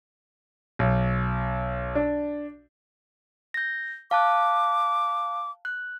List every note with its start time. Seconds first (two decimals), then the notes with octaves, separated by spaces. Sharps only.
0.79 B1
1.95 D4
3.54 G6 A#6
4.11 F5 A5 D6 F#6
5.65 F#6